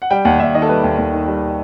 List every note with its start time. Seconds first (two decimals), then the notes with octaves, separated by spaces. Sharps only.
0.02 F#5
0.11 G3 G5
0.25 D#2 F#5
0.40 D#2 E5
0.54 D#3 D#5
0.62 A4
0.69 G3 B4
0.84 D#2
0.98 D#2
1.13 D#3
1.28 G3